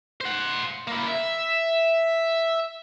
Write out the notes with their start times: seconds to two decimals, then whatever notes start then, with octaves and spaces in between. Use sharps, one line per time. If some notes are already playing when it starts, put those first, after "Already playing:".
0.21 C5 F#5
0.88 A#3 E4
1.08 E5